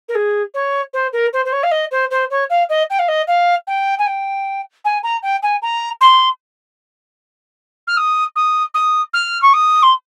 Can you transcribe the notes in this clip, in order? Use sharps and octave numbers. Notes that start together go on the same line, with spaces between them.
A#4
G#4
C#5
C5
A#4
C5
C5
C#5
F5
D#5
C5
C5
C#5
F5
D#5
G5
F5
D#5
F5
G5
G#5
G5
G#5
A#5
G5
G#5
A#5
C6
F6
D#6
D#6
D#6
F6
C#6
D#6
C6